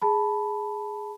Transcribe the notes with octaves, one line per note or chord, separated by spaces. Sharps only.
G#4 A5 B5